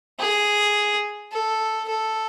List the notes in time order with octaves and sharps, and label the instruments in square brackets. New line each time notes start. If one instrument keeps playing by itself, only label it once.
[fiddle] G#4
A4
A4